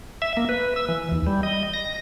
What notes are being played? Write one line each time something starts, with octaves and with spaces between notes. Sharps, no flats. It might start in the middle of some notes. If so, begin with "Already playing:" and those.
E5
A#3
B4
E6
E3
D#2
G3
D#5
A#6